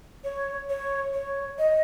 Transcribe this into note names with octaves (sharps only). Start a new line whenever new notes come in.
C#5
C#5
C#5
D#5